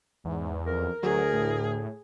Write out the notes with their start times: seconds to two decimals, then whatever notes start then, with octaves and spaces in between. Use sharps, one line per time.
0.25 E2 G#2
0.66 F2 A#4
1.03 D2 F#3 G#4
1.33 A2